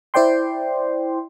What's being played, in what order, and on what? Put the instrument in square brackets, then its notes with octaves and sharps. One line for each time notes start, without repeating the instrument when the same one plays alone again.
[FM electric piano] E4 C5 D5 G5 C6